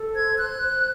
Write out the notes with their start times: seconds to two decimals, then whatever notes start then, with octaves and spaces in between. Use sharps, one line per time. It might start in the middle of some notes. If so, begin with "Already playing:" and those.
Already playing: A4
0.14 C5 G#6
0.37 C5 F#6
0.58 C5